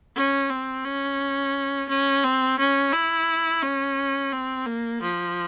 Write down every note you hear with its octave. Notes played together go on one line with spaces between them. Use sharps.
C#4
C4
C#4
C#4
C4
C#4
E4
C#4
C4
A#3
F3